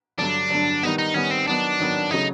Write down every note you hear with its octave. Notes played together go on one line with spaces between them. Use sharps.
G2 D3 F#3 D4
G2 D3 F#3
D#3 G3 B3 D#4
D#4
D#3 G3 B3 C#4
C4
D#3 F#3 B3 D4
D#3 F#3 B3
C#3 F#3 A3 D#4